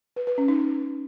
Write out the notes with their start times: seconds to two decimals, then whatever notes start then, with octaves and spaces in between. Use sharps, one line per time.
0.16 B4
0.27 B4
0.38 C#4
0.48 D#4